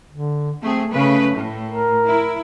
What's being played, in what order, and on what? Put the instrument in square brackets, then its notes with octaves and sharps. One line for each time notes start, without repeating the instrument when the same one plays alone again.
[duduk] D3
[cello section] A3 G#4 [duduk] C4
[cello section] C#3 B4 [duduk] A3
[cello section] A2
[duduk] A#4
[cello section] E4